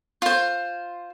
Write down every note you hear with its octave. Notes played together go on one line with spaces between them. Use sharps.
F4 C5